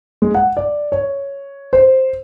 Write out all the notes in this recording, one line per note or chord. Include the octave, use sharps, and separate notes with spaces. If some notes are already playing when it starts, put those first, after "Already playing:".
G#3
F#5
D5
C#5
C5